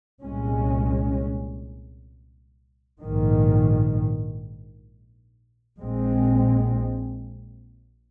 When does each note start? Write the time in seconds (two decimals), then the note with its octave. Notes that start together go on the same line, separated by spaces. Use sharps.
0.22 C2 A#2 G#3 C#4
3.00 A#1 G#2 D#3
5.80 A#1 A#2 G#3 C4